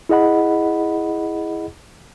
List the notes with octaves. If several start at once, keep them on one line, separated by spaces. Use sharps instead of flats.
E4 G#4 D#5 F#5 B5